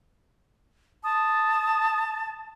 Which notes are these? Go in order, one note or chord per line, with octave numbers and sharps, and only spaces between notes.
A5 D#6